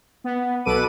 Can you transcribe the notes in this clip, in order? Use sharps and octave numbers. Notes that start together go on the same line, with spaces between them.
B3
B1 B2 A4 B4 D6 D#7